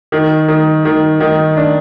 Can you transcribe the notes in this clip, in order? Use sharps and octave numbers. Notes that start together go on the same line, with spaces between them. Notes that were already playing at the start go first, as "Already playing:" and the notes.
D#3
D#3
D#3
D#3
D4